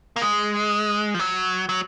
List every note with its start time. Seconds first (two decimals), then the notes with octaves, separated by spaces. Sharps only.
0.16 A#3
0.22 G#3
1.14 F3
1.19 F#3
1.69 F#3